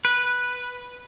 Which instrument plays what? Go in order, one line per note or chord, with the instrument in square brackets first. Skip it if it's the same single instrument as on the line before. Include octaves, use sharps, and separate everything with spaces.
[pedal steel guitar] B4